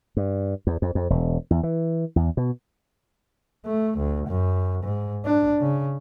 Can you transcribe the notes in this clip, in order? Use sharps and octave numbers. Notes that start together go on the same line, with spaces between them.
G2
E2
F2
F2
E1
E2
E3
E2
B2
A3
D2
F#2
G#2
D4
C#3